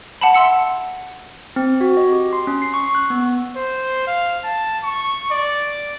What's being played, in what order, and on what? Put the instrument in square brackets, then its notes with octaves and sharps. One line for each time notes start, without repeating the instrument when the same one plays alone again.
[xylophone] F#5 A5 B5
E5 F#5 C6 E6 C#7
[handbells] C4
F#4
D#5
G4
C6
C#4
C7
C#6
F#6
B3
[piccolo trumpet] C5
F5
A5
C#6
D5